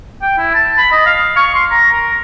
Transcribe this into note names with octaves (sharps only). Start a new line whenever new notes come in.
G5
E4
A5
B5
D#5
F5
C#6
C6
A#5
A#4